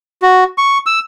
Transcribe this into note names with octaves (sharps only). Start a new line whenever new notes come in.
F#4
C#6
E6